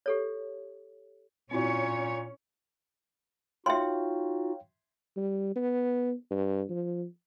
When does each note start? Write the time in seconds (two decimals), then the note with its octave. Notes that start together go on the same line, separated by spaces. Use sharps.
0.06 G4 A4 C#5
1.51 A#2 C4 C#4 E4 F#4 C#5
3.66 D#4 F4 F#4 C#5 E5 F5 G5 C6
5.16 G3
5.56 B3
6.31 G2
6.70 F3